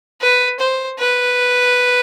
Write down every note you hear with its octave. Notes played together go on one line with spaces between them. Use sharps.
B4
C5
B4